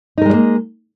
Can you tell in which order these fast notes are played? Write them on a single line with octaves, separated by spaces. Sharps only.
D#4 A#4 G#3 G3 A#3